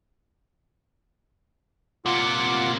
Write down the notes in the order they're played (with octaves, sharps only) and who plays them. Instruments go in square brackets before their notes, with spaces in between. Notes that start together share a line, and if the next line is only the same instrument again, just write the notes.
[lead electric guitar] C3 A#3 [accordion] F4 F#5 D6